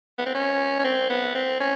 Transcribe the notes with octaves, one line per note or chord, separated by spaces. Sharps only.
B3
C4
C#4
C#4
C4
B3
C4
C#4